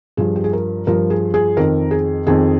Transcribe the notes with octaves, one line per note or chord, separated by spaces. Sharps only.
G2 F3 G#4
G4
G#4
A#4
G2 F3 A#4
G#4
G#4
F2 D#3 A#4
G#4
F2 D#3 G#4